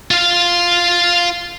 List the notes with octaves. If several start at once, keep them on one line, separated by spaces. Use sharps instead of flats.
F4 F5